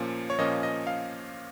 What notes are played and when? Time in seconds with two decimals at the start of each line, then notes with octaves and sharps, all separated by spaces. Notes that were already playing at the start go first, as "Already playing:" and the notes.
Already playing: A#2 F3 A#3 C#4
0.30 C#5
0.39 A#2 F3 A#3 C#4 D#5
0.63 D#5
0.87 F5